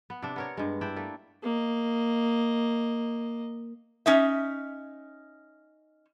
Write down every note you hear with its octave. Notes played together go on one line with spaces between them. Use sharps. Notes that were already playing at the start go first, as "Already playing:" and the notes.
B3
C3 D4
B3 A#4 C#5
G2 G#3
D4 E4 E5 G5
A3 A#3
A#3 D#5
C#4 D#4 E5